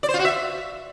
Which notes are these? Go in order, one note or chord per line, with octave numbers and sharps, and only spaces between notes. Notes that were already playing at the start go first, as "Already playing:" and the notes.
D5
C5
F4
F#4
E5